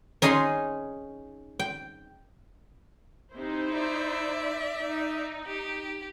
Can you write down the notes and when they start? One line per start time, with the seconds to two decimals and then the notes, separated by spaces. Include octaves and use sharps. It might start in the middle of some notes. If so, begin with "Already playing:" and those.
0.22 C#4 D#4 G#4 F5 G#5 C6
1.59 G5
3.34 C3 D#4 E4 C5
3.74 D5 E5
4.80 D#4
5.46 G4